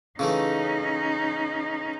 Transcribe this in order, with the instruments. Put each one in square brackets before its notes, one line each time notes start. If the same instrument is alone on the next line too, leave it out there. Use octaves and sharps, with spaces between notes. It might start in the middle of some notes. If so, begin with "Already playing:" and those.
[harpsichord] C#3 E3 A3 [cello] C#4 D#4